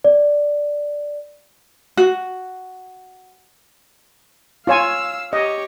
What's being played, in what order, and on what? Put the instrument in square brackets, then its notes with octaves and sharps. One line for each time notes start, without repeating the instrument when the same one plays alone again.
[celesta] D5
[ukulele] F#4
[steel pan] F4 C#5 G#5 [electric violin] F5 E6
[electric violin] G4 C#5 [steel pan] D#5